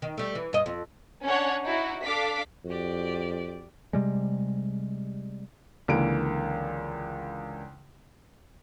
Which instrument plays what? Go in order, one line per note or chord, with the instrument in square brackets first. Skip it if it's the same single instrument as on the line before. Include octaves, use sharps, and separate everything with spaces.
[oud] D#3
G3 A3
E3
G2 D#5
F2
[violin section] C#4 D4 C#5 F#5
D#4 E4 F#4
D4 A4 F5 D6 B6
[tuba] F2 [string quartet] F#4 G4 D5
[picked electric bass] C3 G3 G#3
[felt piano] C#2 D3 E3 A#3 D7